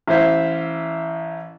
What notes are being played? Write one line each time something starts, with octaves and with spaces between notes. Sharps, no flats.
A1 E4 C5 E5 F5